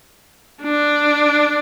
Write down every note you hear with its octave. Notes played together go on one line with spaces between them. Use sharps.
D4